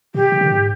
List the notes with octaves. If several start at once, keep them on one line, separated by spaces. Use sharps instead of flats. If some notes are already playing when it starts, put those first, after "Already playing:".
A#2 G4
C3
D3
G#2